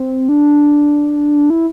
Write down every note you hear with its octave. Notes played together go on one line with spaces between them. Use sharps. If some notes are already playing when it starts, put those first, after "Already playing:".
Already playing: C4
D4
E4